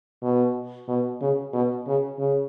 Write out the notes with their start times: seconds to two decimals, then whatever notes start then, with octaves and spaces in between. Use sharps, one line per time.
0.23 B2
0.89 B2
1.22 C#3
1.53 B2
1.87 C#3
2.19 C#3